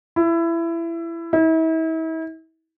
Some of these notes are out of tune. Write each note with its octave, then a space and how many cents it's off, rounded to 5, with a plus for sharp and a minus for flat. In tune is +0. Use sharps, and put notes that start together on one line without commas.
E4 +20
E4 -40